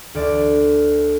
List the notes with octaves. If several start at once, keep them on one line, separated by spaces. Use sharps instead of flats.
D2 D5